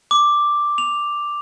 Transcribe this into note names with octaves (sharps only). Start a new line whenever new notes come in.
D6
F7